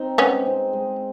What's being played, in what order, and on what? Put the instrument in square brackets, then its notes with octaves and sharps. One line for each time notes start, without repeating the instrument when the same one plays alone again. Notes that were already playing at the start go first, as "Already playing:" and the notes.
Already playing: [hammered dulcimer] C4 D#4
[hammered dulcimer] G#3 [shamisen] B3 C#4
[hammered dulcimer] C4 D#4
G#3